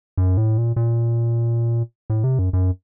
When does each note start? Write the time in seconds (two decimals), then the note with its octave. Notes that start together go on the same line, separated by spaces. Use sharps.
0.17 F#2
0.37 A2
0.58 A#2
0.76 A#2
2.10 A2
2.24 C3
2.39 F#2
2.53 F#2